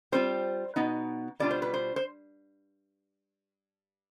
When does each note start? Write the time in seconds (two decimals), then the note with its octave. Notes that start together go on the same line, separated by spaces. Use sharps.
0.12 G3 C4 F4 C5
0.76 B2 B3 D#4
1.40 B2 G3 D4 F4 D5
1.51 C5
1.62 B4
1.74 C5
1.96 C5